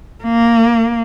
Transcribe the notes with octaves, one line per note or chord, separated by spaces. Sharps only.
A#3